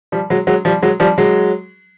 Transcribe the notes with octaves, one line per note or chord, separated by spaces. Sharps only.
F3 G3
F#3 G#3
F#3 G#3
F3 G3
F#3 G#3
F3 G3
F#3 G#3